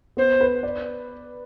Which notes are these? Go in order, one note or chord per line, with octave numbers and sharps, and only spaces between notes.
B3 C5
B4
D5